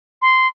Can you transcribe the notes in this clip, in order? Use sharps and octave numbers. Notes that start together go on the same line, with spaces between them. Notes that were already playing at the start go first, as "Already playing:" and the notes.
C6